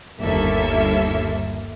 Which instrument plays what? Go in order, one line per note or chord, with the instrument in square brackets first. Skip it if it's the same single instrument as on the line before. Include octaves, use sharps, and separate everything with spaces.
[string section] G1 D#2 A#3 A4 E5